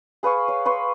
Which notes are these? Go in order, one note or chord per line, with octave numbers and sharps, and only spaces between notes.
G#4 B4 F5 C#6
C#5
B4 C6 C#6